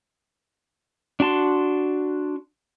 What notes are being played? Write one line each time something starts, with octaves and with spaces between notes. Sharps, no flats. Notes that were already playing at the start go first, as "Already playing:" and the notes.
D4 F#4 A5 C6